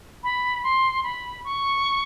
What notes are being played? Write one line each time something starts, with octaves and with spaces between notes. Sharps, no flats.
B5
C6
B5
C#6